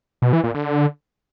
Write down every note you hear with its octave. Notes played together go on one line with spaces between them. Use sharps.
B2
E3
A#2
D3